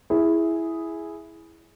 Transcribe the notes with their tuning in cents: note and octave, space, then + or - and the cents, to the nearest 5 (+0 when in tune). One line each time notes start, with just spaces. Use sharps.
E4 +0 G#4 +0